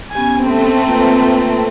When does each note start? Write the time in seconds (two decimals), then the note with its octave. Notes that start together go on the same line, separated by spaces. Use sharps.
0.15 B3 C#4 G4 G#5
0.46 A3 C4
0.86 A#3 F4 B4